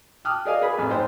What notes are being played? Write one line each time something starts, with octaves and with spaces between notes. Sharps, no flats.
G5 A5 D6 D#6 F6 F#6
G#4 A#4 D5 D#5 F5 G#5
G#4 B4 B5
A1 F2 G#5
G#2 C5 G5